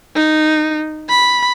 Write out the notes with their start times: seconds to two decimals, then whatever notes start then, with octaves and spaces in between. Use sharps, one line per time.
0.16 D#4
1.10 B5